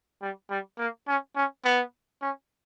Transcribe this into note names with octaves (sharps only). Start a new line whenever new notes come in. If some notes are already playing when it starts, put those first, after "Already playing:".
G3
G3
A#3
C#4
C#4
B3
C#4